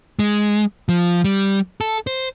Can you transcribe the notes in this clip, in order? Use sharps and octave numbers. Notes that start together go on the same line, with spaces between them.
G#3
F3
G3
A4
C5